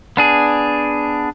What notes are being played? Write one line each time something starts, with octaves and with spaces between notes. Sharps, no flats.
B3 D4 G#4